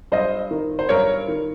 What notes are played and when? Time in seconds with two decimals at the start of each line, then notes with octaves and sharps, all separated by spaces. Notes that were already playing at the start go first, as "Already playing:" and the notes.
0.12 G2 C5 D#5
0.51 D#3
0.79 C5
0.89 G2 A#4 C#5
1.28 D#3